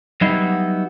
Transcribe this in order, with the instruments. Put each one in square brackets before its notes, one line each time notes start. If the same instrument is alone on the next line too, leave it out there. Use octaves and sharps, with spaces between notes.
[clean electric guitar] F#3 G3 B3 D#4 E4 F#4